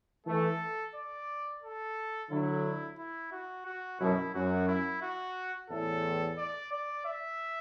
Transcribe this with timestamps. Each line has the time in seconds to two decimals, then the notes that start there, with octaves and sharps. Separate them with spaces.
0.26 E3 A3 A4
0.95 D5
1.62 A4
2.30 D3 F#3 E4
2.98 E4
3.32 F#4
3.66 F#4
4.00 F#2 B2 E4
4.33 F#2 F#4
4.68 E4
5.02 F#4
5.70 E2 A2 A4
6.38 D5
6.72 D5
7.05 E5